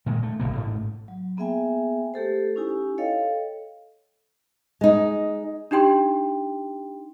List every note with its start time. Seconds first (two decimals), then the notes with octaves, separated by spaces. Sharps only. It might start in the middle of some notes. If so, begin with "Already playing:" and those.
0.06 A#2 D#3 G#3
0.23 A3
0.40 D1 E2 B2 A#3
0.55 A1 G#2 A3
1.08 F#3
1.37 A#3 B3 G#4 E5 G5 G#5
2.14 A3 G4 A4 C5
2.56 C#4 D#4 E4 G4 G#5
2.98 A4 C#5 D#5 F5 G5
4.81 G#3 D#4
5.71 D4 D#4 G4 G5 C6